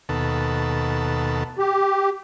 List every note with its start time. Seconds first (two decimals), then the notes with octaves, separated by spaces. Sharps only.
0.09 D#2 B2 A4
1.58 G4